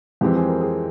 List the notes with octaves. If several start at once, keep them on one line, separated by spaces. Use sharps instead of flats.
F2 E3 G#3 C4 G4
G#4
A#4
G#4